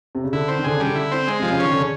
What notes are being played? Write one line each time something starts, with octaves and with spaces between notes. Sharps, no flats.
C3
C#3
D3 E4
C4
D#3
D3 G#4
C#3 G3
D3
E4
C4
G#3
C3 F3
C#3
D#3 C#4
D3
C#3